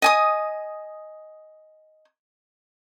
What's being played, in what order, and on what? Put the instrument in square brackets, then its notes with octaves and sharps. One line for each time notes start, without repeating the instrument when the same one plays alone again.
[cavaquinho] D#5 G#5 D#6